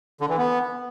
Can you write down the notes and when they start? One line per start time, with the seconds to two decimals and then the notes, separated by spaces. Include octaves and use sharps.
0.21 D3
0.29 E3
0.38 B3